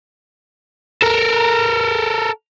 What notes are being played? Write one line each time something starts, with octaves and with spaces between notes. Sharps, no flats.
A4 A#4